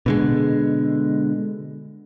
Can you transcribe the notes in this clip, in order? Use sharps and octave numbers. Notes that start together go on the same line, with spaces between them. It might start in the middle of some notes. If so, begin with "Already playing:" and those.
B2 D3 G#3